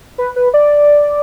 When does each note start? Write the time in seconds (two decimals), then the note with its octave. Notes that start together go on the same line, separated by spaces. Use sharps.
0.18 B4
0.36 B4
0.54 D5